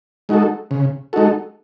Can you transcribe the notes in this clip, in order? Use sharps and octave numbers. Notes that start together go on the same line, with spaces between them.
G#3 D#4 F#4 A4
C#3
G#3 D#4 F#4 A4